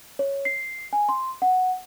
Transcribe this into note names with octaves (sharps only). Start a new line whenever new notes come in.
C#5
C7
G#5
C6
F#5